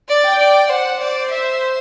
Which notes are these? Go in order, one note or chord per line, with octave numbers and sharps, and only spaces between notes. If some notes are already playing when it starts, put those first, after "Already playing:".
D5
G5
D5
C5 F#5
D5
E5